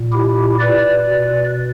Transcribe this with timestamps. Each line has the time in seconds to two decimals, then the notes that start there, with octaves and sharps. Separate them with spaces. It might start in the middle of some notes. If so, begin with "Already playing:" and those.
Already playing: A#2
0.13 E4 G4
0.59 B4 D5
1.07 B2